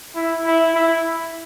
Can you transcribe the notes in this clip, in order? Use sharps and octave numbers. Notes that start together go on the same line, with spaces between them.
E4
E4
E4